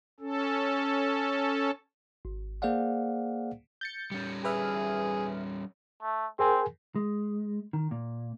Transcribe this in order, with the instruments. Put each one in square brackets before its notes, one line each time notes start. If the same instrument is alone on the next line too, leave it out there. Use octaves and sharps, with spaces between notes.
[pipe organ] C#4 A4
[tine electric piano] G#1
A#3 G#4 C5 D5 F5 F#5
[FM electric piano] G6 A6 C#7
[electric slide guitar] G3 C#4
[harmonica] G#4 [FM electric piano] B4 E5 F6
[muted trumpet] A3
[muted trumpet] C4 [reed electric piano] G#4 A#4 G#5
[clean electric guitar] G#3
D#3
A#2